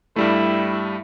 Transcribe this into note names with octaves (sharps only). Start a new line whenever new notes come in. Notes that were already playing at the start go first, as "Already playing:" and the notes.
G2 G3 A3 E4